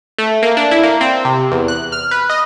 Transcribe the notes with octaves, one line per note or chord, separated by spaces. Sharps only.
A3
A#3
D4
E4
A#3
C4
C3
E2
F#6
F6
B4
D#5